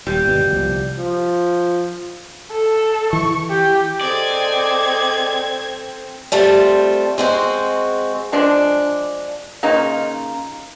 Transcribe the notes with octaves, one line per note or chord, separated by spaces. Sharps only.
D#1 G3
G1 B2
C2 F3
F3
A4
E3 C#6
G4
C4 G#4 A4 D5 D#5 G#5 G#6
G3 A3 C4 F4
G#3 C4 F#4
F3 G#3 D4
C#3 A#3 D#4 F4